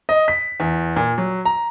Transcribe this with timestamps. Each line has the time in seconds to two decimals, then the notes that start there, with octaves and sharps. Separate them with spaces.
0.09 D#5
0.28 B6
0.60 E2
0.96 A#2
1.18 F#3
1.45 A#5